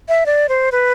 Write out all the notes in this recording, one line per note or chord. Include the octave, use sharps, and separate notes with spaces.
E5
D5
C5
B4